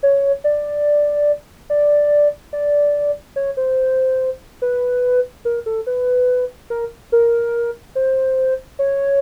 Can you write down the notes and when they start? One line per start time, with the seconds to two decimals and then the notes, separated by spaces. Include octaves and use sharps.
0.03 C#5
0.44 D5
1.70 D5
2.53 D5
3.36 C#5
3.57 C5
4.62 B4
5.45 A#4
5.66 A4
5.87 B4
6.70 A#4
7.12 A#4
7.95 C5
8.79 C#5